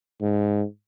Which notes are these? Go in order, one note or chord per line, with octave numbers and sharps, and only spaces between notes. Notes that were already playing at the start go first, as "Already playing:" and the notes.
G#2